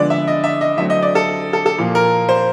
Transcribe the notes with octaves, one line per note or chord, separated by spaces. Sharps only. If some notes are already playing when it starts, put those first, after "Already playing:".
Already playing: D3 F3 G#3 B3 D5
E5
D#5
E5
D#5
D3 F#3 A3 C4 E5
D#5
D5
A4
A4
A4
A#2 F3 A#3
A#4
C5